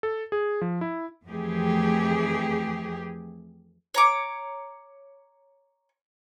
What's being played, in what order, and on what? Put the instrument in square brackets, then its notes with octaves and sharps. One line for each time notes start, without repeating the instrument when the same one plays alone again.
[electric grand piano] A4
G#4
F3
E4
[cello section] F2 E3 A3 G4 G#4
[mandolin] C#5 A#5 D6